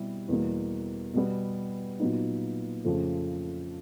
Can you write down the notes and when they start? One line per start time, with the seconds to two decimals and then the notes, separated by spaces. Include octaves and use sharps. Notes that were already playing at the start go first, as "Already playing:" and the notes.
Already playing: B2 G3 C4 E4
0.28 E2 B2 G3 A#3
1.14 B2 G3 B3
2.00 A#2 F#3 B3 D#4
2.84 F2 C#3 F3 A3